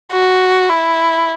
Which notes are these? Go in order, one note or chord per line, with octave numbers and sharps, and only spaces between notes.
F#4
E4